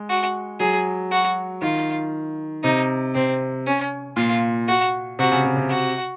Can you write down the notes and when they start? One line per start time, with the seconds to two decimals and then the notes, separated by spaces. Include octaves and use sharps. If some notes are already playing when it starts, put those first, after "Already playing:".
Already playing: G#3
0.09 F#4
0.60 F#3 G#4
1.11 F#4
1.62 D#3 F4
2.63 C3 D#4
3.15 C3 C4
3.66 C#4
4.16 A#2 F4
4.68 F#4
5.19 C3 F#4
5.32 C#3
5.45 C3
5.57 C3
5.70 F#4